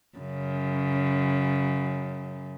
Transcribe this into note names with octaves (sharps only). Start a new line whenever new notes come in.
F#2 C#3